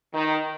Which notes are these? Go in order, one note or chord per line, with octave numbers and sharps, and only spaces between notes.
D#3